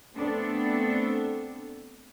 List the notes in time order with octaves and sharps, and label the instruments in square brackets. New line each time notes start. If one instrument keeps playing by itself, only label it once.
[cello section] A3 B3 C4 D4 A4